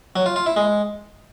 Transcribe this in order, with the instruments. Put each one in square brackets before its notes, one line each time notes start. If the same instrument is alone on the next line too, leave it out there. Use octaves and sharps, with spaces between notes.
[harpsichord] F#3
F4
F4
E4
G#3